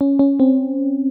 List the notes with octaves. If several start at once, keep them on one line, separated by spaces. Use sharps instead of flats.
C#4
C#4
C4